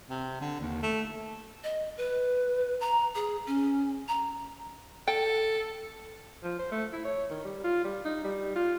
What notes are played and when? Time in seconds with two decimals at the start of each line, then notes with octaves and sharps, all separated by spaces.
0.10 C3
0.41 D3
0.60 D#2
0.82 A3
1.64 D#5
1.97 B4
2.81 A#5
3.15 G#4
3.47 C#4
4.08 A#5
5.08 A4 G5
6.43 F3
6.59 C5
6.72 A3
6.93 E4
7.05 C#5
7.30 D#3
7.45 G3
7.64 F4
7.85 G3
8.05 D#4
8.24 G3
8.56 F4